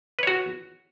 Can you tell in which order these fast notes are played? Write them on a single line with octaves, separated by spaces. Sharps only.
B4 C#5 F#4